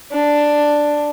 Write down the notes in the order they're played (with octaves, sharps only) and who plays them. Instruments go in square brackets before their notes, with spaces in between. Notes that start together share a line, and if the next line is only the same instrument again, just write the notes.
[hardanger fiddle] D4